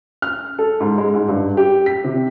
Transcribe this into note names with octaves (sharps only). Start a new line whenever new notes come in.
F6
A4
G#2
G#3
G#2
G2
G4
B6
C3